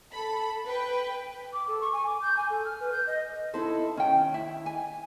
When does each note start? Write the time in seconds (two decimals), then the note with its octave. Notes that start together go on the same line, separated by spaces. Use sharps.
0.14 A4 B5
0.67 B4 G5
1.53 D6
1.68 A4
1.81 C#6
1.93 G#5
2.06 D6
2.22 G6
2.37 G#5
2.50 A4
2.65 F6
2.80 B4
2.92 G6
3.07 D#5
3.54 D#4 E4 A4 C5
3.97 D#3 C#4 G5
4.34 E4
4.66 G#5